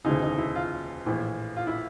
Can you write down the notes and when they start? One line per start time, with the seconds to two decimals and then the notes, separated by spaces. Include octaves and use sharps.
0.04 E1 D2 C#3 E3 D#4
0.22 D#4
0.38 E4
0.56 F4
1.06 A#1 A2 E3
1.57 F4
1.67 E4